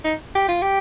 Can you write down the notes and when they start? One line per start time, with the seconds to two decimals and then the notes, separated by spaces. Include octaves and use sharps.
0.05 D#4
0.35 G4
0.48 F4
0.62 G4